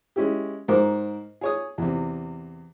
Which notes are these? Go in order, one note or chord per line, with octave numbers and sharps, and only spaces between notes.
G#3 C#4 E4 G4
G#2 A#4 C5 D6
G#4 C#5 D#6
E2 C3